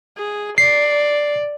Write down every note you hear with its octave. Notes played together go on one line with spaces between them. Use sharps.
G#4
D5 C7